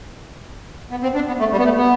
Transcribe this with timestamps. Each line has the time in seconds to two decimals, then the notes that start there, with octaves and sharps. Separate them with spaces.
0.91 B3
1.03 C4
1.15 D4
1.27 B3
1.39 A3
1.52 G3
1.58 B3
1.64 A3
1.76 B3